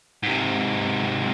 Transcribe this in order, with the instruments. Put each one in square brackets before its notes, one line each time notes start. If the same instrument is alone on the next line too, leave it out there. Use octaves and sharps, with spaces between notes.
[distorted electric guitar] G#2 C3